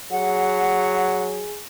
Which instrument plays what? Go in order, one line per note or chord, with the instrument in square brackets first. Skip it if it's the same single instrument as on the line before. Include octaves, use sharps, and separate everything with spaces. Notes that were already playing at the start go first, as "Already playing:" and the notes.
[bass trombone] F#3 [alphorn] G#4 [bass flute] F#5